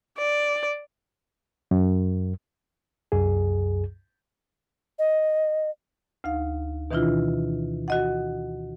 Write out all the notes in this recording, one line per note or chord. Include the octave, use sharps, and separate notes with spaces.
D5
F#2
C2 F#2 G#4
D#5
D2 D#4 F5
B2 D#3 E3 D4 E4 F4
F#4 D#5 F#5